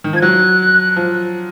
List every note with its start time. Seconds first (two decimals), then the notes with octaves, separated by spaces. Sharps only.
0.04 D#3
0.13 F3 G#6
0.22 F#3 F#6
0.96 F3